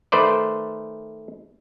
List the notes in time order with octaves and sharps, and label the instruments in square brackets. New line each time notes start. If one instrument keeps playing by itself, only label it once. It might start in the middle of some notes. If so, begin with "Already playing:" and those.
[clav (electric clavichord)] D#3 A3 B4 C5 D5